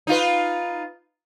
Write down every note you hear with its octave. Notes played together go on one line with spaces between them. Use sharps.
D#4 F4 B4